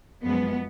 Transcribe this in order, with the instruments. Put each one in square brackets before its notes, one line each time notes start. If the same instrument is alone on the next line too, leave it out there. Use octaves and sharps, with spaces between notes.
[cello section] F#2 F3 G#3 B3